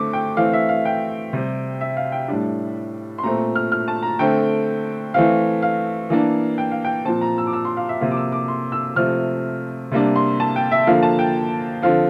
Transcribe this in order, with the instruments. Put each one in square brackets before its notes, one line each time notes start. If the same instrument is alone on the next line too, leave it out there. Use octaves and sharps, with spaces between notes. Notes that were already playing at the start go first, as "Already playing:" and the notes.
Already playing: [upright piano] D3 A3 C4 D6
G5
E3 A3 C4 F5
E5
F5
G5
C3 G3 C4
E5
F5
G5
A2 G3 D4
C6
A#2 A3 C4 A#5
F6
F6
A5
A#5
D3 A3 C4 G5
E3 A3 C4 F5
F5
E3 A#3 D4
G5
F5
G5
A#2 F3 C4 A5
A#5
E6
D6
E6
C6
F5
E5
C3 F3 A#3 F5
D6
E6
D6
C6
E6
C3 F3 A3 C4 F6
C3 G3 A#3 D4
C6
A5
G5
E5
D3 F3 A#3 F5
A5
G5
D3 F3 C4 F5